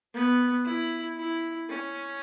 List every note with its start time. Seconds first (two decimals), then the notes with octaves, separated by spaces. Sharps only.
0.13 B3
0.65 E4
1.17 E4
1.69 C#4